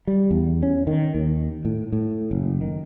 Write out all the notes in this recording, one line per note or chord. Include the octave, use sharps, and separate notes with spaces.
G3
E2
C#4
D#3
D#2
A2
A2
F#1
D#3